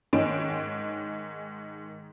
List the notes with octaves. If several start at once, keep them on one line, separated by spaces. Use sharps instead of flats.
G#2 D#3 G#3 C#5 D7